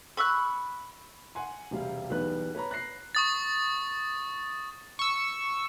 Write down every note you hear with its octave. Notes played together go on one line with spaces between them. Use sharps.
B5 C#6 E6 F#6
F#5 G#5 C6
E1 C3 G3 F5
B1 E2 G3 B3 B4 F#6
B4 C#5 A#5 B5
F#6 A#6 C7
C#6 D#6 A6
C#6 E6